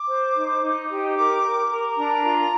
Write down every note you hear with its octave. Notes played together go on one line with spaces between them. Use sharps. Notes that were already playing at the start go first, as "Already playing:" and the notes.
Already playing: D6
C5
D#4
D#4
G4
A#4 D6
A#4
A#4
D4 A#5
F4